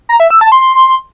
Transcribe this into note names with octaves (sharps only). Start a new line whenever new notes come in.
A#5
E5
E6
A5
C6